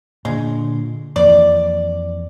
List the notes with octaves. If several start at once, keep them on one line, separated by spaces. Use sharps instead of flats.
A#2 D3 G#3
F2 E3 A#3 D5